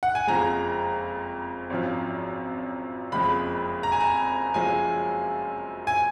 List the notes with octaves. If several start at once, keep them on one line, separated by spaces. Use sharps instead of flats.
F#5
G#5
F#1 F2 F3 G#3 A#5
G#1 F#2 F3
F#1 F2 F3 G#3 B5
A#5
G#5
A#5
F#1 F#2 F3 G#3 G#5
G#5